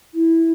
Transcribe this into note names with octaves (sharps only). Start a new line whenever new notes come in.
E4